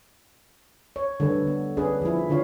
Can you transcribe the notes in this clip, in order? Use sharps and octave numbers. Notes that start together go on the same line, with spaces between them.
C#5
D3 G3 A4 B4
B3
C#4 D4 G#4 B4
F3 E4
D3 D4 F4 C#5 F5